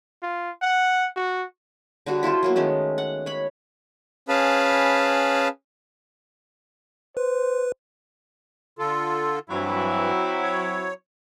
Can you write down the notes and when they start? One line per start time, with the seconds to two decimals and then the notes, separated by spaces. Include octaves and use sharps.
0.22 F4
0.62 F#5
1.16 F#4
2.06 D3 G3 F#4 G#4
2.23 E4 F4 A4 C5
2.43 F#3 A#3 B3
2.56 D#3 G#3 A3 C#4
2.98 F#5
3.26 C#5 B5
4.29 C#4 G#4 B4 F5 A5 B5
7.17 B4 C5
8.79 D3 F4 A4
9.49 G2 E3 F#3 C4 E4
10.42 C#5